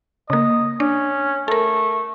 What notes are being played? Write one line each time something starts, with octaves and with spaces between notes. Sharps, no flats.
C#3 A#3 D#5
C#4 D4
A3 A4 A#4